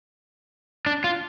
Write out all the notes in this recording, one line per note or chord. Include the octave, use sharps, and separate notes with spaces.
D4
F4